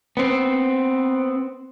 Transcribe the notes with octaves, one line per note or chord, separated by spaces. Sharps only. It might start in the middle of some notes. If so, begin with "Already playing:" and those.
B3 C4